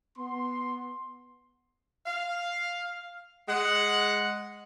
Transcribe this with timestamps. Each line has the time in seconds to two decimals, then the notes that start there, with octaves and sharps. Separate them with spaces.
0.18 B3 C6
2.06 F5
3.48 G#3 F#5